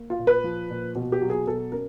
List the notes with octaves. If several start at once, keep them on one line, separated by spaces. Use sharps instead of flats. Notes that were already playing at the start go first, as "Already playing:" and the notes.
Already playing: A#3
F4
A#2
B4
F3
A#2
B2
G4
F#3
G#4
B2 A4
C#4 A#4